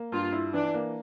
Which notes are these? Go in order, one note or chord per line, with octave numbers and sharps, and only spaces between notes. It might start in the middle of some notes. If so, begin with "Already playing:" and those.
Already playing: A#3
G2 F4
E4
E3 D4
A#3